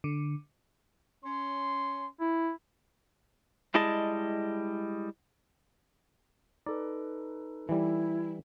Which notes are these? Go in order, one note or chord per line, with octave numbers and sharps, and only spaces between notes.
D3
C#4 C6
E4
G3 G#3 E4 G#4 D#5 A5
D#4 A4 B4 D5
E3 G3 E4